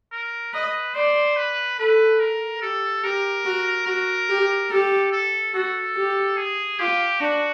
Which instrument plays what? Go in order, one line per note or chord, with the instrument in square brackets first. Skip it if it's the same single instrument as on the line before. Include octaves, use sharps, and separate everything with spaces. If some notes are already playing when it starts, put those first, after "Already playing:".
[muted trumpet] A#4
[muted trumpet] B4 [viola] D#5
[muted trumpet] C5 [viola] D5
[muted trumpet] B4
[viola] A4 [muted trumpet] B4
[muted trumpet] A#4
[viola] G4 [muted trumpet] A4
[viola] G4 [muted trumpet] A#4
[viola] F#4
[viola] F#4 [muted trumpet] A#4
[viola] G4
[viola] G4 [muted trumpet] A4
[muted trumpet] A4
[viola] F#4 [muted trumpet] A4
[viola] G4
[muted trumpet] G#4
[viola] F4 [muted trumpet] G4
[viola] D4 [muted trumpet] F#4